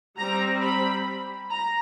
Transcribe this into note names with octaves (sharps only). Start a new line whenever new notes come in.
G3 C4 A#5
B5
A#5